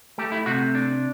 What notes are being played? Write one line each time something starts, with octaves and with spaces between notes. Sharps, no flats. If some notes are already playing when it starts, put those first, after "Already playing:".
A3 G4
E4
C3 F#4
D4